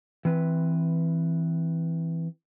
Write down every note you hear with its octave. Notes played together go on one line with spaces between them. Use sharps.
E3 C4 B4